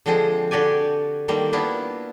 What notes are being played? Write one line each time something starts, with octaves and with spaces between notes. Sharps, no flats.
D3 F3 G#3 C4 D4 G#4
D3 F#4 G4 D5 G#5
D3 D#3 G3 A#3
A#3 B3 D4 E4 F4